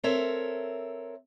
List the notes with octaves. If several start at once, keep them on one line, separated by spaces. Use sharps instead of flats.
C4 A4 A#4 C#5 E5